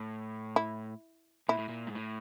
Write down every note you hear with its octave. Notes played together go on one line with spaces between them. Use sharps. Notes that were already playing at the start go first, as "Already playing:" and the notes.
Already playing: A2
E4
A#2 E4
A2
A#2
G#2
A2